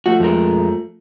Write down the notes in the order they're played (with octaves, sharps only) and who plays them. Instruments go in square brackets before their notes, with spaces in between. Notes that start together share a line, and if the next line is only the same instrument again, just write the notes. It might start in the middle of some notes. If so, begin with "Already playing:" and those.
[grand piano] F3 A3 [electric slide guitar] F#4
[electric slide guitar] F2 G#3 A#4